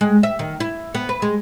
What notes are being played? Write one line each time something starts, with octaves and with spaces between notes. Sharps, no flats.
G#3
E5
D#3
E4
B3
B4
G#3